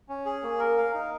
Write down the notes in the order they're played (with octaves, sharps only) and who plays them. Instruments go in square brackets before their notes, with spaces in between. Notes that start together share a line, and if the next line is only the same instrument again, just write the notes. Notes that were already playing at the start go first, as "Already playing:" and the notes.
[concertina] C#4
G#4
A#3
A#4
F5
D#4